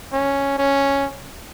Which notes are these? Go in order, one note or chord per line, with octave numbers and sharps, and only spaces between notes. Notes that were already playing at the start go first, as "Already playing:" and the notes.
C#4
C#4